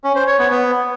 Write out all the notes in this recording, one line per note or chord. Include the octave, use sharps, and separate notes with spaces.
C#4
C5
C#5
B3
B3